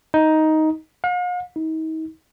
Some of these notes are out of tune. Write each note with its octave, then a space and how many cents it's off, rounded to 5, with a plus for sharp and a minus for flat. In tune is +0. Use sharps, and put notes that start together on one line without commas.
D#4 +10
F5 +45
D#4 +40